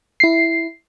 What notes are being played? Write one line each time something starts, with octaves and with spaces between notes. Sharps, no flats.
E4 C7